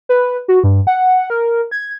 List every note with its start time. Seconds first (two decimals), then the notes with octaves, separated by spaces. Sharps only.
0.09 B4
0.48 F#4
0.64 G2
0.87 F#5
1.30 A#4
1.71 G#6